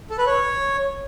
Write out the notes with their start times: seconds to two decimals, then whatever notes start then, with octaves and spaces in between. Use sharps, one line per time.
0.10 A4
0.18 B4
0.26 C#5